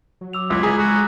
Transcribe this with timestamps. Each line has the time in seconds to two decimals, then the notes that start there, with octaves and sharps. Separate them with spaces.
0.21 F#3
0.33 D6 E6 F7
0.50 C#2 E4 D6 E6 G#6
0.63 G#3 G#4 A#5 B6
0.79 G#3 F#4